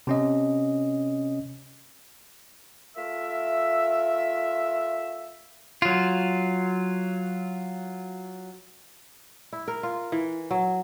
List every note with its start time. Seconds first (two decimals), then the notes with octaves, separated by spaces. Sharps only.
0.07 C3 C#4 D#5
2.97 A3 F4 A#4 E5
5.82 F#3 F4
9.53 E4
9.68 A#4
9.83 F4
10.12 E3
10.51 F#3